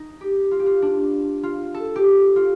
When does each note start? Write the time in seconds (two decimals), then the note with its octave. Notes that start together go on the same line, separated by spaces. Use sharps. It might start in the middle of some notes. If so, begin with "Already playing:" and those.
Already playing: D#4
0.21 G4
0.51 F4
0.60 G4
0.66 F4
0.82 D4
1.43 F4
1.74 A4
1.96 G4
2.36 F4